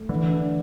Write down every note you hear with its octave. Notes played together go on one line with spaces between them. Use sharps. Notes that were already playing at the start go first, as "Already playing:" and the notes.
Already playing: A3
D3 E3
D4